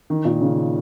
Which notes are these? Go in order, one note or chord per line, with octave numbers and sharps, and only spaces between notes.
D#3
A#2
C#3